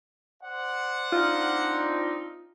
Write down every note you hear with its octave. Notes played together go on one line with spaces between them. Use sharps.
C5 D5 F#5
C4 D4 D#4 F4